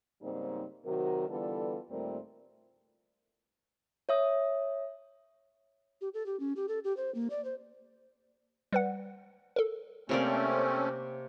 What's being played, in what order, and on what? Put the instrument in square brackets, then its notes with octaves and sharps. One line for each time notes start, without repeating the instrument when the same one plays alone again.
[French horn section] G#2 C#3 G3 A#3 C4 D#4
C3 D#3 F#3 F#4 A#4
D3 E3 G3 B3 F4 A4
D#2 A#2 G3 A3 C4 A#4
[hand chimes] C#5 E5 D#6
[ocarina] G4
A4
G4
C#4
G4
A4
G4
C5
A#3
D5
C5
[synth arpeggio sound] G3 B4 F#5
A4 A#4
[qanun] C3 A#3 D5 [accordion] A3 C4 C#4